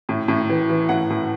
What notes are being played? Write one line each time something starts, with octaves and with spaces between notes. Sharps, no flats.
A2
A2
E3
E3
A2 F#5
A2